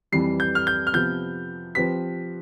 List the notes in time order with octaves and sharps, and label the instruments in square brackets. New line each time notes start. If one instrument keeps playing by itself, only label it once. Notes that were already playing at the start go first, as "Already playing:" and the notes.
[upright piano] F2 E3 G3 [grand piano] C7
[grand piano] G6
F6
G6
F6
[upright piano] C3 F3 B3 [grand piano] G6
[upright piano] F3 C4 G4 B4 [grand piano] B6